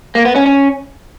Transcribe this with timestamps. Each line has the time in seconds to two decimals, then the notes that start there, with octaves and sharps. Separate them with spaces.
0.15 A#3
0.25 B3
0.35 C#4
0.46 C#4